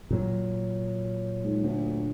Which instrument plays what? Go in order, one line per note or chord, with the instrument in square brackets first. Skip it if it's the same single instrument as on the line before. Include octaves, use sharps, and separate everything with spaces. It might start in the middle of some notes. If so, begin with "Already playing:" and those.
[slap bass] A#2 F#3
[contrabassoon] G#2
D2